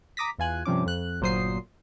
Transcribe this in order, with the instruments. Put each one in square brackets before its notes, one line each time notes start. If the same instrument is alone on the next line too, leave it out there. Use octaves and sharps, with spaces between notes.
[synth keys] A#5 D6 D#6 A#6 B6
E2 F4 G#5 F#6
G2 C3 F3 C#4 D6
F2 F#6
G1 A#2 F#3 C5 D#6 C7